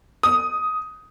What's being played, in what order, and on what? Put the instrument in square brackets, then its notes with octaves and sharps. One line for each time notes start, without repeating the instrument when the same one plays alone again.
[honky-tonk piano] D#6